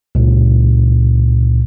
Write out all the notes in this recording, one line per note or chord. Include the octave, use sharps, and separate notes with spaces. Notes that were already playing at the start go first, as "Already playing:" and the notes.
C#2 A#2